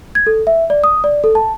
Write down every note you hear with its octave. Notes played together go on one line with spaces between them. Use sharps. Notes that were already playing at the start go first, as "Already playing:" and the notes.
G#6
A4
E5
D5
D#6
D5
A4
A5